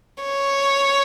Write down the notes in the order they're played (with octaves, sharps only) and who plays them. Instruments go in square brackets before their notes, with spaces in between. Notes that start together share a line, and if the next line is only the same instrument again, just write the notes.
[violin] C#5